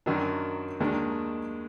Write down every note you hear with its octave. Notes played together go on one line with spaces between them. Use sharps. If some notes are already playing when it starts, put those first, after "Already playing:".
F#2 D#3 F#3 D4
D#2 D#3 G#3 D4